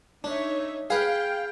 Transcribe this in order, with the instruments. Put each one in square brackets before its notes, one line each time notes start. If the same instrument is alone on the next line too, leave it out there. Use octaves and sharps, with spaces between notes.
[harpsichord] D4 [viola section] D#4 C#5 E5
[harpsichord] G#4 B4 [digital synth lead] F5 [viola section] G5